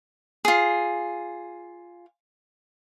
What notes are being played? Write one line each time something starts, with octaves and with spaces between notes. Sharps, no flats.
F4 G#4